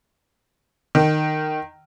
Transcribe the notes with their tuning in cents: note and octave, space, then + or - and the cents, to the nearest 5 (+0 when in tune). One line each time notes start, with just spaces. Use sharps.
D#3 -15